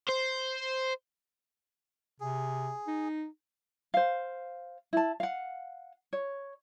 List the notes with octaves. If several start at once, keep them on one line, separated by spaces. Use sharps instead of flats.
C5
C3 G#4
D#4
C5 F5
E4 A5
F5 F#5
C#5